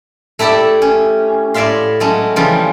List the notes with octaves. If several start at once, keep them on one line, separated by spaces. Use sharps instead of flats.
A3 E4 G4 A4 D5 E5
C#4
A2 C#5 D5 E5 F5 C6
F#3 G#3 A3 C#4
C#3 E3 F3 G3 F4